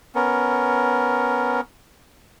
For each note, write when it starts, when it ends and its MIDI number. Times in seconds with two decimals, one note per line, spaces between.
0.15 1.61 59
0.15 1.61 61
0.15 1.61 70